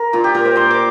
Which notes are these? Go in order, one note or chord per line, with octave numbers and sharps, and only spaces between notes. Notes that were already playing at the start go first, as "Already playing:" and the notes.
Already playing: A#4
A#2 F4
G4
A#2 A#4
C5
A#2 C6
D6